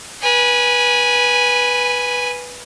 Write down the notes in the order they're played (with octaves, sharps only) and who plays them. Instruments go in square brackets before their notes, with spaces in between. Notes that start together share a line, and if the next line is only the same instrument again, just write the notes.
[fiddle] B4 G#5